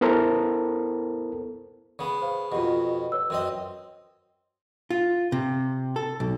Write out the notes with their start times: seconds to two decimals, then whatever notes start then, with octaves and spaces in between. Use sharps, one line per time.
0.01 B3 E4 A4 A#4 C5
1.99 C#3 B3
2.22 C5 F5
2.52 F2 B2 F4 G4 F#5
3.12 B4 C#5 E6
3.30 F#2 C4 D#5
4.90 F4
5.32 C3
5.96 A4
6.20 B1